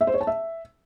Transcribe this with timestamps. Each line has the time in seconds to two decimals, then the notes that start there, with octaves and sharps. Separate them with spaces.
0.01 E5
0.07 C5
0.14 C#5
0.21 A5
0.27 E5